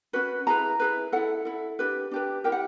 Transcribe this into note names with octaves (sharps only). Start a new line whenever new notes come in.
C#4 F#4 B4
E4 G#4 B4 A#5
E4 G#4 B4
E4 A4 F#5
E4 A4
D4 G4 B4
D4 G4 B4
E4 G4 A#4 G5
F#5